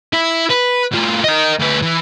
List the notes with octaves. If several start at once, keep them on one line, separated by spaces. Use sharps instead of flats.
E4
B4
A2 F4
A#4 D#5
D2 B4
E3